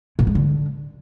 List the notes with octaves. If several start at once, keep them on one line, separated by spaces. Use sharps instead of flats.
A#2
G#2
D3